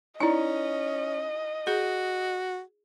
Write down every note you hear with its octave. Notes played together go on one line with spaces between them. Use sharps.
C#4 D#4 E4 D5 D#5 G#5
F#4 G#4